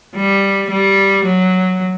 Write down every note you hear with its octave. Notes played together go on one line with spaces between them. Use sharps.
G3
G3
F#3